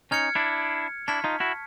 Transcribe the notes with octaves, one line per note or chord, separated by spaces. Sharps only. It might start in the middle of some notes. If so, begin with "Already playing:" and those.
C#4 D#4 F6 G#6 C#7
D4 E4
D4 E4 A5 C#6 F6 G#6 B6
D#4 F4
E4 F#4